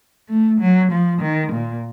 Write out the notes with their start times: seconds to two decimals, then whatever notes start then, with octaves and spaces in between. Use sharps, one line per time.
0.29 A3
0.60 F#3
0.92 F3
1.21 D#3
1.52 A#2